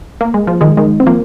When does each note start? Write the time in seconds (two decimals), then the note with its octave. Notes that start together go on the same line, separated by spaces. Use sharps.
0.21 A#3
0.34 G#3
0.47 F3
0.61 D#3 G#3
0.77 D#3 G#3
1.00 C4
1.07 F3 A#3